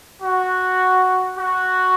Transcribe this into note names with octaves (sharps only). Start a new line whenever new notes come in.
F#4
F#4